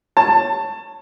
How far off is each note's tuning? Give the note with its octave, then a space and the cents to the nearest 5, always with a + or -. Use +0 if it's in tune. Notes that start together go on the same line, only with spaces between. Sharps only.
C#5 -5 A5 +15